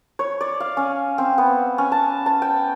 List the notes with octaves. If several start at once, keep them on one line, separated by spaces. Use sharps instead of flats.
C#5
D5
F5
C#4
C4
B3
C#4
A5
A5
G5